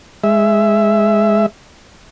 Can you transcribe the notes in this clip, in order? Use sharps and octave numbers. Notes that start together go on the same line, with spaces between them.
G#3 E5